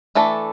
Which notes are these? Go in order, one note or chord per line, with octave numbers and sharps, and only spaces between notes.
E3 A3 D4 A4